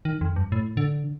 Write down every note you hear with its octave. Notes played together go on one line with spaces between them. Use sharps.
D#3
F2
G2
A2
D3